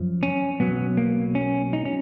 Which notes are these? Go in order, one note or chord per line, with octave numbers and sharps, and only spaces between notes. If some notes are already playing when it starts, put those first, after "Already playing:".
Already playing: F#2 F3
C#4
B1 B2 F#3 B3
A#3
C#4
D#4
C#4